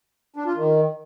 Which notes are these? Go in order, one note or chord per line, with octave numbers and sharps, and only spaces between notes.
D4
F4
D#3